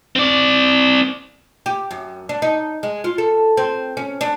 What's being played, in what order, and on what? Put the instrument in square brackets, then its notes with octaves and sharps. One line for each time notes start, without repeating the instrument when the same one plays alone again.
[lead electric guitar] C4 D5
[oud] G4
F#2
D4
D#4
G#3
F4
A4
C4
C#4
D4